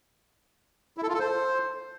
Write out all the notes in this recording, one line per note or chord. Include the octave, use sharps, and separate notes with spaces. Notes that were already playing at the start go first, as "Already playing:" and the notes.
E4
A4
F4
A4
C5